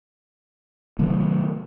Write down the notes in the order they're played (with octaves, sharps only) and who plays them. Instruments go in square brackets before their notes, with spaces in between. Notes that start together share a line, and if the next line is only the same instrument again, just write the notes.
[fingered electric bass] C3 D#3 F#3 A3